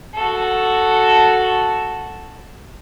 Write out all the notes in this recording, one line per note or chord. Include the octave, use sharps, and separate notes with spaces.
F#4 A4